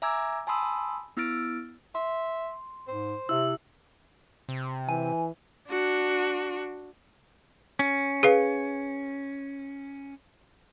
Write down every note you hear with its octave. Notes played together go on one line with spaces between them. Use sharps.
E5 G#5 A#5 D6 E6 G#6
G#5 A5 B5 C6 D#6 E6
B3 E4 E6 F6 A6 D7
E5 C6
G#2 C5
C3 E4 E5 E6
C3
E3 G#5
D4 F#4
C#4
G#4 B4 F5